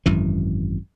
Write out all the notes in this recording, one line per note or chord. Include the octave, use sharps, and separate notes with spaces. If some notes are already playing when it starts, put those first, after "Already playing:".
G#1 F#2 E3